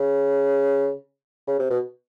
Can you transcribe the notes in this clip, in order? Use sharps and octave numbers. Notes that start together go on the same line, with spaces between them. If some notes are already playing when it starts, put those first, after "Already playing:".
Already playing: C#3
C#3
C3
B2